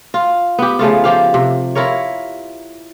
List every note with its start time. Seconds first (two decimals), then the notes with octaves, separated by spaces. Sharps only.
0.14 F4
0.58 B3 G4
0.79 C#3 F3 A3 F4
1.04 F3 G4 F5
1.34 C3
1.75 E4 F4 A#4 C#5